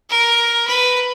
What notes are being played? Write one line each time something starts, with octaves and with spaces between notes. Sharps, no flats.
A#4
B4